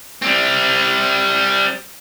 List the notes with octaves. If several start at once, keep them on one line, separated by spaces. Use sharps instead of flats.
G3 C4